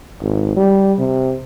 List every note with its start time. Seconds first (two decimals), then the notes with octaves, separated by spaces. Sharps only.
0.22 G#1
0.56 G3
0.99 C3